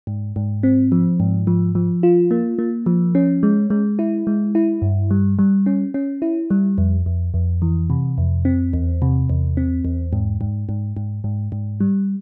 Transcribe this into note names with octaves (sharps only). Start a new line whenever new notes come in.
G#2
G#2
C4
F3
G#2
F3
F3
F4
A#3
A#3
F3
C#4
G#3
G#3
E4
G#3
E4
G2
G3
G3
C#4
C#4
E4
G3
F2
F2
F2
E3
C3
F2
C4
E2
C3
E2
C4
E2
G#2
G#2
G#2
G#2
G#2
G#2
G3